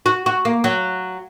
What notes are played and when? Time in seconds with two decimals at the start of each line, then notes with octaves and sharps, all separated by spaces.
0.06 F#4
0.26 F#4
0.45 A#3
0.64 F#3